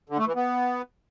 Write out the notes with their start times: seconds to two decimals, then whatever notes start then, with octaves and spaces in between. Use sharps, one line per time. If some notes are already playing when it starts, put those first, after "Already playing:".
0.09 D3
0.18 A3
0.27 E3
0.36 B3